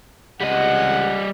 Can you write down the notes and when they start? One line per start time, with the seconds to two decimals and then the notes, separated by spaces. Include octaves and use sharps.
0.41 C#2 C3 G3 D#5 F#5